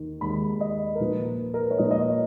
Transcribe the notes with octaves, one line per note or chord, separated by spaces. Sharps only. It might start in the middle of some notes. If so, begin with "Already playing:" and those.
Already playing: D#2 D#3
D#2 D#3 G#3 D#4 B5
D#5
A#4
A#2 F3 A#3 D#4 B4
A#4
B4
C#5
A#2 F3 A#3 D#4 D#5
D#5
C#5